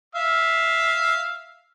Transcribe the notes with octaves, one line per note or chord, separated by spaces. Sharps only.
E5 F5